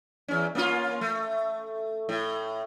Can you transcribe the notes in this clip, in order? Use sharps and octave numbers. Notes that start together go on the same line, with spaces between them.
E2 C#4
A#3 C#4 F4
A3
A2